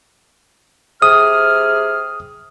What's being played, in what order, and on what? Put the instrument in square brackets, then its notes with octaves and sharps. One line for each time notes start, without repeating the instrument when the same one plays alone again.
[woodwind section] C3 G#4 F6 [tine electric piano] D#6